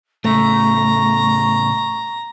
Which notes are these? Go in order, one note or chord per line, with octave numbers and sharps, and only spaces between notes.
A2 C#3 A3 A#5 C#6